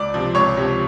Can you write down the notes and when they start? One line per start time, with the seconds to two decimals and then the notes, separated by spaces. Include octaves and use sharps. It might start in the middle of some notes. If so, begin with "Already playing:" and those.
Already playing: C#2 D5 D6
0.14 C3 F3
0.35 C#2 C#5 C#6
0.57 C3 F3